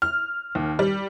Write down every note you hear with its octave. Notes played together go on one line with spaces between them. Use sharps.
F6
D#2
G3